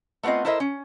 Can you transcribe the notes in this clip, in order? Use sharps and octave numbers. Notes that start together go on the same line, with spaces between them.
A3 B3 C4 F4 D#5
E4 A4 A#4 C5 D#5 E5
C#4